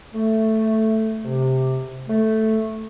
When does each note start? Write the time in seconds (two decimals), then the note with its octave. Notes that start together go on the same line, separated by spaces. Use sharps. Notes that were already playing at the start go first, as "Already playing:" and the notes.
0.13 A3
1.25 C3
2.08 A3